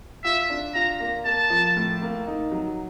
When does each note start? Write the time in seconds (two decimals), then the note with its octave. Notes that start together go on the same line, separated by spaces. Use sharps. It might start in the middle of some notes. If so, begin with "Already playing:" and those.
0.24 F4 E5
0.50 D4
0.75 F4 A#5
1.00 A#3
1.25 A#3 A5
1.50 F3
1.76 A2
2.02 A#3
2.27 D#4
2.51 F#3